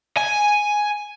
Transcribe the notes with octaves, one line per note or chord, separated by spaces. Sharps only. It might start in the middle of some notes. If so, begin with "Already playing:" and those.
G#5